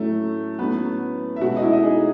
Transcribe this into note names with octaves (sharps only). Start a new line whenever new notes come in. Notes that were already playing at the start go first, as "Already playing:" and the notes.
Already playing: A2 F#3 A3 C#4 A4
A2 F#3 A3 B3 C#4 B4
E5
B2 G#3 C#4 F#4 F#5
D#5
E4 E5
D#4 D#5
G#4